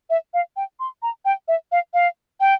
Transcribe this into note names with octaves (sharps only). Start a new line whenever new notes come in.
E5
F5
G5
C6
A#5
G5
E5
F5
F5
G5